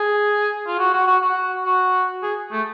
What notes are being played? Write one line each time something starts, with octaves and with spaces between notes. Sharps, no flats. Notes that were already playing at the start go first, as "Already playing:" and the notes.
Already playing: G#4
F4
F#4
F#4
F#4
F#4
F#4
G#4
A3